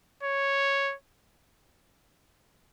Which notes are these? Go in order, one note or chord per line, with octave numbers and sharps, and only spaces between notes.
C#5